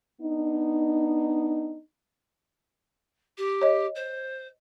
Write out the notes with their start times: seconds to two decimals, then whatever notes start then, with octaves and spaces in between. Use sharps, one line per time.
0.21 B3 D4 D#4
3.37 G4
3.61 C#5 D#5
3.95 C5